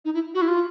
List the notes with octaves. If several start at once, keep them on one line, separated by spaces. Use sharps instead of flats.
D#4
E4
F#4
E4
F4